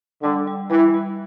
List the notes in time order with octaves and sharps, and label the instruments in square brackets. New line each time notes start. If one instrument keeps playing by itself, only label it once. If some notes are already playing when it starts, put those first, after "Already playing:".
[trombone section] D3 [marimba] G3
[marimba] G3
[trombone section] E3 [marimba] G3
[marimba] G3